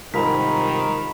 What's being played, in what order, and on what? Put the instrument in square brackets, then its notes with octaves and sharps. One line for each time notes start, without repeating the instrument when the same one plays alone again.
[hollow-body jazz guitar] C2 G#2 [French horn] D#3 [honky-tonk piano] F4 A#4 [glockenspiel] A#5 B5 B6